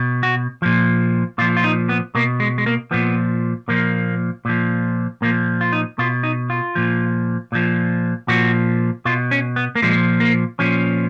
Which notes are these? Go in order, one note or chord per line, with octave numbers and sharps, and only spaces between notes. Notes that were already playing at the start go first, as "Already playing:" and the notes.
Already playing: B2
F#4
A#2 F3
A#2 F3 F4
F4
D#4
B3
B2 A#3
G#3
G#3
A#3
A#2 F3 B3
A#2 F3 A#3
A#2 F3
A#2 F3 A#3
F4
D#4
B2 F4
D#4
F4
A#2 F3
A#2 F3
A#2 F3 F#4
B2 F4
C#4
B3
A#3
A#2 F3 G#3
A#3
A#2 F3 C#4